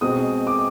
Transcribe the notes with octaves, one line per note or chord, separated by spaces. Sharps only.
B2 G#3 C4 D#6
D6